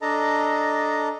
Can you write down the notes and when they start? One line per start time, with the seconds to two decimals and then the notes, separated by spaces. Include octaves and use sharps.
0.02 D4 A4 D#5 A5 A#5